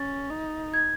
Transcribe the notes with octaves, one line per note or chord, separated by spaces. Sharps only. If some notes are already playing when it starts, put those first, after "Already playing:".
Already playing: C#4 A6
D#4
G#6